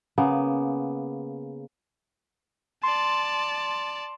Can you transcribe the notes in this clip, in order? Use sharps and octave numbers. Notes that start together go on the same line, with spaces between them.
C#3 A#3 B3
D5 A5 C6